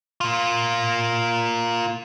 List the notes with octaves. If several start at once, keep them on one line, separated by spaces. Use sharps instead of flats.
A#3 F4